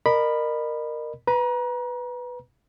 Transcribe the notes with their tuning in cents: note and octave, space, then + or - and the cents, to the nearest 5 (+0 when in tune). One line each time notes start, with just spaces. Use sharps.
A#4 +0 D#5 -40 B5 +0
B4 +5 A#5 +35